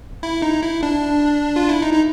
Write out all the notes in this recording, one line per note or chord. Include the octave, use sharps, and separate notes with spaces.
E4
D#4
E4
D4
F4
E4
D#4
D#4